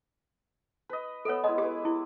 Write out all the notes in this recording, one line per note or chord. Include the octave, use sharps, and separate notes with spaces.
B4 D#5
B3 A4 C#5 E5
G#3 E4 D#5
G4 B4 D6
E4